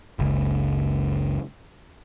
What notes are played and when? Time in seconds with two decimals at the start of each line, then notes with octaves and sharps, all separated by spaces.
0.19 F#1 C#2